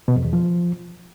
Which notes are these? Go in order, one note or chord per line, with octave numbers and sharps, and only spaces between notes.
B2
F2
E2
F3